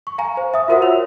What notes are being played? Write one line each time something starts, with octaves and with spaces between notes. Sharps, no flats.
C#6
F5 G#5 A#5
C5
E5 D#6
F4 F#4 A#4 C5 E5 F#5
C#5 E6 F7